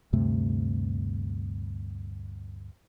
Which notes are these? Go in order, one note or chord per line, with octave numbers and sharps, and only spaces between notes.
D2 G2 C3 A3